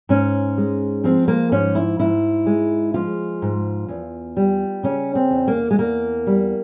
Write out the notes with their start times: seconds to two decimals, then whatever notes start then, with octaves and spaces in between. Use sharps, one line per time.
0.09 G#2 C#4
0.58 G#3
1.04 F3 C4
1.28 A#3
1.52 G#2 C#4
1.75 E4
1.99 G#2 E4
2.46 G#3
2.94 F3 F4
3.42 G#2
3.88 E2
4.37 G3
4.83 C#3 C#4
5.15 C4
5.31 E2
5.48 A#3
5.71 G#3
5.78 E2 A#3
6.27 G3